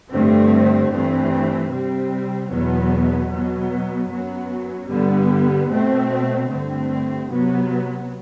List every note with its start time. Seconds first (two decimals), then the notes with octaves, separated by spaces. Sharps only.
0.10 G2 D3 A3 C4
0.90 G2 E3 A3 C4
1.69 C3 G3 C4
2.49 E2 B2 F#3 B3
3.28 B2 F#3 B3
4.08 F#2 F#3 B3
4.88 G2 D3 G3 B3
5.68 B2 A3 C4
6.47 G2 D3 A3 C4
7.26 C3 F#3 B3